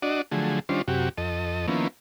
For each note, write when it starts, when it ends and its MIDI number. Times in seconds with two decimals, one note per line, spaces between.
0.02 0.22 62
0.02 0.22 66
0.02 0.22 74
0.02 0.22 75
0.31 0.59 50
0.31 0.59 53
0.31 0.59 54
0.31 0.59 57
0.31 0.59 68
0.69 0.82 51
0.69 0.82 55
0.69 0.82 61
0.69 0.82 62
0.69 0.82 65
0.69 0.82 72
0.88 1.09 42
0.88 1.09 48
0.88 1.09 66
0.88 1.09 67
1.18 1.66 41
1.18 1.66 69
1.18 1.66 75
1.68 1.88 51
1.68 1.88 53
1.68 1.88 58
1.68 1.88 59
1.68 1.88 61
1.68 1.88 64